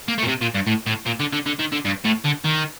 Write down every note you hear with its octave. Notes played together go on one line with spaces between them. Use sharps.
A#3
A3
A#2
C3
A#2
G2
A2
A2
A#2
D3
D3
D3
D#3
D3
G2
A2
D3
D#3